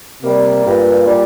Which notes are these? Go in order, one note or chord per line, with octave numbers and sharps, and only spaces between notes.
C3 G3 A#3
G2 A#2
G3